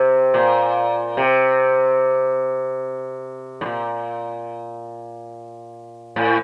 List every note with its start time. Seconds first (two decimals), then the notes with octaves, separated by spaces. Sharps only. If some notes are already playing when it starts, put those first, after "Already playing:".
Already playing: C3
0.34 A#2
1.17 C3
3.61 A2
3.66 A#2
6.16 A2